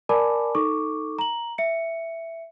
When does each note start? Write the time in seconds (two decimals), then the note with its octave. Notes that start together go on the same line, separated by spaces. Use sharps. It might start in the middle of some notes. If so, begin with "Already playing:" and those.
0.09 A#4 D5 G#5 A5 B5 D6
0.55 D#4 A4 C#6 D6
1.19 A#5 F#7
1.58 E5 C#7